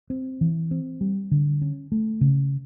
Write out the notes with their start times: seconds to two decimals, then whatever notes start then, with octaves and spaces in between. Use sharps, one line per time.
0.10 C4
0.41 E3
0.71 C4
1.01 G3
1.31 D3
1.62 C#4
1.92 A3
2.21 C#3